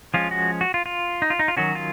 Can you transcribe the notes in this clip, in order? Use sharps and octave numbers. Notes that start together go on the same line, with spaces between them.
F3 G#3 C#4 F4
F#4
F#4
F4
F4
D#4
F4
D#4
F4
D#3 F#3 C#4 F#4
F4